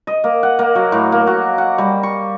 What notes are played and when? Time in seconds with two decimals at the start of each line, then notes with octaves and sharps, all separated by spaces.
0.07 D#5
0.24 A#3
0.43 F#5
0.59 A#3
0.75 F#3
0.92 A2
1.12 A#3
1.27 F#4
1.58 F#5
1.78 G3
2.03 C#6